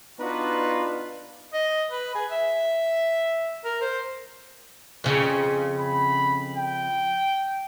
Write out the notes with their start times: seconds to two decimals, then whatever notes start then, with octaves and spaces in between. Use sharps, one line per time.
0.19 B3 D4 D#4 F4 F#4 B4
1.53 D#5
1.91 B4
2.15 G#4
2.31 E5
3.64 A#4
3.81 C5
5.04 F2 C#3
5.80 B5
6.56 G5